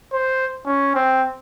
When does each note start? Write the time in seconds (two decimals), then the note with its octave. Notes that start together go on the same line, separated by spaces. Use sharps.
0.13 C5
0.66 C#4
0.95 C4